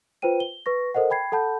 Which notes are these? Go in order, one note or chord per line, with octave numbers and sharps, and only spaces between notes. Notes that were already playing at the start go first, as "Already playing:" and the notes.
F4 B4 C5 G5 D#7
G7
B4 C#6 A#6
A4 A#4 C5 D#5 F#5
G5 B5 G#6 C7
A4 F#5 A5 B5 G6